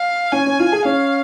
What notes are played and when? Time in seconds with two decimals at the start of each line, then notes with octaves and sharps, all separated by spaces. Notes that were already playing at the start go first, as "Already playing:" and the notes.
Already playing: F5
0.32 C#4 G#5
0.46 C#4
0.59 F4
0.72 G#4
0.85 C#4 F5